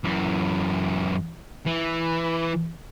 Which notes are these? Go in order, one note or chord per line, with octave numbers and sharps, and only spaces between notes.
F#2 E3
E3